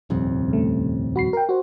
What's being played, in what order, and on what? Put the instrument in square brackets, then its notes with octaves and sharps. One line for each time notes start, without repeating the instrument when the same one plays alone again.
[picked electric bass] D#1 C2 F2
[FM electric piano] C#3 A3
F#4 B5 C7
A#4 G5
F#4 C5